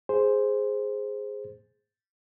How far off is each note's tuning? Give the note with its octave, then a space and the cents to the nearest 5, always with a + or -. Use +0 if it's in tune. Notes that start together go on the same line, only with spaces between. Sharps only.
G#4 +0 C5 +0